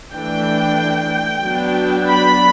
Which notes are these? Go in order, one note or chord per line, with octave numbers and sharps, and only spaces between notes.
E3 A3 D4 G5
F#3 B3 D4
B5